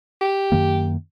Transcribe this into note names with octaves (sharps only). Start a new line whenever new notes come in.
G4
F#2 D#3 A#3